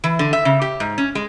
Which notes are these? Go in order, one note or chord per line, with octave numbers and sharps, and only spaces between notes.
E3
D3
E5
C#3
G4
G#2
C#4
G#3